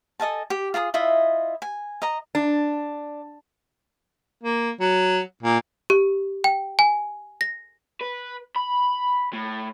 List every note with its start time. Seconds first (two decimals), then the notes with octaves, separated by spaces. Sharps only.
0.20 A4 D#5 G#5 A5
0.50 G4
0.74 F4 G#4 A5 D#6
0.94 E4 F4 D#5 E5
1.62 G#5
2.02 D#5 A#5
2.35 D4
4.43 A#3
4.80 F#3
5.43 A#2
5.90 G4
6.44 G5
6.79 G#5
7.41 A#6
8.01 B4
8.56 B5
9.33 A2